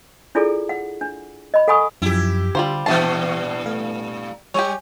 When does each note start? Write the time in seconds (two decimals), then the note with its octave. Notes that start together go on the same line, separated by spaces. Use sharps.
0.35 D4 E4 F4 G#4 A4 D5
0.69 F#5
1.01 D4
1.54 D#5 B5
1.68 A4 F#5 G#5 B5 C#6 D#6
2.02 F#2 F3 E4 G4
2.55 D3 G3 F4 C5
2.86 G2 A#2 E3 G4 E5 A5 C7
3.66 A3 F5
4.54 G3 G4 C#5 G#5